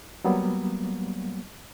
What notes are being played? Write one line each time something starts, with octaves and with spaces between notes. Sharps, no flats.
F#3 G3 A#3 B3